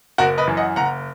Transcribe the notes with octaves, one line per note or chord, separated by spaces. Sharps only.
F#1 F#4 A#4
B4 D#5
F#2 E3
D#5 F#5
F#1 F#5 A#5